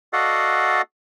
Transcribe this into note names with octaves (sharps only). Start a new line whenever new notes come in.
F#4 A4 D5 D#5 F5 F#5